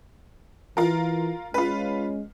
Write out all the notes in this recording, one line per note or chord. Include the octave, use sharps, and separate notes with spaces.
E3 F4 A#4
G#3 C#4 F4 B4